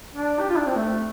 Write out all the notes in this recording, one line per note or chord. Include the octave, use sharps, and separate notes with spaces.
D4
G4
F4
D4
C4
A3